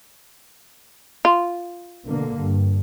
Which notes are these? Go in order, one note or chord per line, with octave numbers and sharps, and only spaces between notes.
F4
B2 D3 A#3
G2